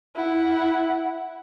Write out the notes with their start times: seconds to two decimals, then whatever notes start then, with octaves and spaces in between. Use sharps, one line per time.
0.16 E4 F#5